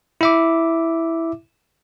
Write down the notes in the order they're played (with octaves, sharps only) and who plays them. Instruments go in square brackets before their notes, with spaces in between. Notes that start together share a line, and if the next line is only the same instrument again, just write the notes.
[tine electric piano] E4 E5 D6